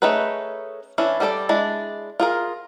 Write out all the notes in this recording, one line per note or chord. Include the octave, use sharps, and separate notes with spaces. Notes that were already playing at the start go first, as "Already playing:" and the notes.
A3 C#4 D#4 G#4 B4
E3 C#4 D4 E4
G3 G4 A4 B4 D5
G#3 D4 E4 D5
F4 G#4 A#4